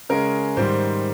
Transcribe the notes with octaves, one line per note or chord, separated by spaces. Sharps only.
C#3 G#3 C#4 A#4
G#2 D#3 G3 C5